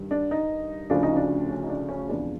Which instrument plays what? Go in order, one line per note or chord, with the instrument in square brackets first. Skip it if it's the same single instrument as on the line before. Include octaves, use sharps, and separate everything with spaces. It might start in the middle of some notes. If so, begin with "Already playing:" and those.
Already playing: [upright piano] G2 D#3 G3
D4
D#4
D2 C#3 F3 D4
D#4
D4
C#4
D#4
D4
C#4
E2 C3 F3 G#3 D4